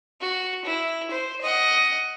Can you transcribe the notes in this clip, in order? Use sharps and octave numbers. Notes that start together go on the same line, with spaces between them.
F#4
E4
C5
D#5 F#5